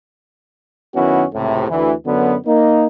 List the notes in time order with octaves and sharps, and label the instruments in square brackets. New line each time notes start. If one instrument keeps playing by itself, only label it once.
[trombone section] F#2 D#3 B3 C#4 E4 F#4
C#2 A2 C3
D2 E3
F#2 D3 F#3 B3
A#3 D#4